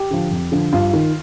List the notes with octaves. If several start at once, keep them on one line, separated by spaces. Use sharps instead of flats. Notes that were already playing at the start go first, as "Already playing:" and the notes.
Already playing: G4
D3 F3
F2
D3 F3
G2 F4
D#3